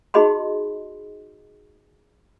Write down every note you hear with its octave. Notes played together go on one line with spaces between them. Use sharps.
D#4 F#4 G#4 D#5 B5 C6